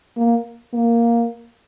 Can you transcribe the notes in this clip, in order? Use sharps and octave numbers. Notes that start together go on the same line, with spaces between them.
A#3
A#3